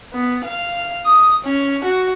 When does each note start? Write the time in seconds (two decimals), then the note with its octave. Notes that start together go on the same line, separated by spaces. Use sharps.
0.14 B3
0.44 F5
1.06 D#6
1.44 C#4
1.84 F#4